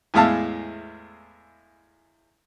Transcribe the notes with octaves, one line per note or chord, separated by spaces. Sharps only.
E2 A2 G#3 E5 F5 A5